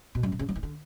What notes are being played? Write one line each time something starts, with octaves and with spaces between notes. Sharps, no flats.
B2
F#2
B2
C#3
F#3
E3
D3